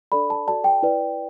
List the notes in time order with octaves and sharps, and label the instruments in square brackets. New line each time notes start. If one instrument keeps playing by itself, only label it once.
[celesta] D4 A4 D5 B5
A5
F#4 A4 D5 A5
G5
E4 B4 D5